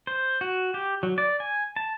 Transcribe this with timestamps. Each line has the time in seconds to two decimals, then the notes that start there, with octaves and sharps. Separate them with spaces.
0.07 C5
0.41 F#4
0.74 G4
1.03 F#3
1.18 D5
1.40 G#5
1.76 A5